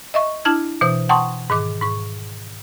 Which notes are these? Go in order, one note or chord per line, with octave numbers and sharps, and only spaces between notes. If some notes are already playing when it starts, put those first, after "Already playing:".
D#5 E5 C#6
D4 E4 A5 F6 G#6
B2 E3 C5 D#6
F#5 G5 A5 C6 C#6 D#6
G#2 D#3 D6
G#2 C#6